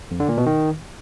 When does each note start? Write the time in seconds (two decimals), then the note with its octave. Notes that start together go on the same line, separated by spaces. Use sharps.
0.11 F2
0.20 D3
0.29 A#2
0.37 B2
0.46 D#3